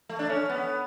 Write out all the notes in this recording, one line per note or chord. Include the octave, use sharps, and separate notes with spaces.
A3
D4
C#4
B3